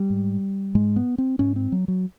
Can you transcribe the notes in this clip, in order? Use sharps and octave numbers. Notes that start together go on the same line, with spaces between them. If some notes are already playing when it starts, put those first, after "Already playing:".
Already playing: G3
G#2
G#2 G#3
B3
C4
G#2 C#4
C4
F#3
F#3